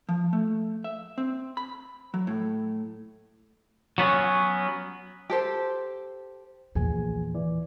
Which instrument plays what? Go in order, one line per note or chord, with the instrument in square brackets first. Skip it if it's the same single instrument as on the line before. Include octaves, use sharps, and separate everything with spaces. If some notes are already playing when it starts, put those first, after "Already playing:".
[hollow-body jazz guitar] F3
A3
E5
C4
B5
F#3
A2
[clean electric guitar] F#3 B3 C#4
[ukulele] G4 A4 C5
[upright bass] E2 A#2 [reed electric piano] F3 G#4 G#5
[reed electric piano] D#2 E3 D5